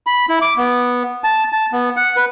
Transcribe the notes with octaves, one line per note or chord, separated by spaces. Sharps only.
B5
E4
D6
B3
A5
A5
B3
F#5
B4